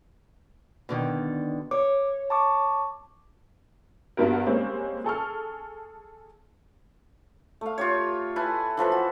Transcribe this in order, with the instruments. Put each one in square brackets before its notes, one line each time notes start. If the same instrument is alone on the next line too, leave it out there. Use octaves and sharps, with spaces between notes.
[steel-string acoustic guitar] B2 D3 D#3
[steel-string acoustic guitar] C#5 [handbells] D6
[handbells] A5 C#6 D6
[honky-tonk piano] G2 G3 B3 F#4 A#4
G3 G#3 A#3 C4 C#4
G#4 A4 C#6 F6
[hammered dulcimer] A3 F5
F4 G4 C#5
E4 B4 G#5 A5
E3 F3 A4 B4
F#4